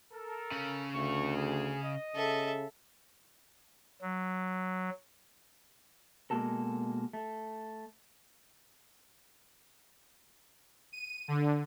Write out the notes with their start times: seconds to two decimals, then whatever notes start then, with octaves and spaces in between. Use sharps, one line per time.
0.13 A4 A#4
0.52 C#3 C#4
0.95 D2 A3 C#6
1.36 G#4
1.83 D#5
2.16 C#3 A4 E5
4.01 F#3
6.30 B2 G#3 A#3 F#4 A4 A#4
7.13 A3
10.92 D#7
11.28 D3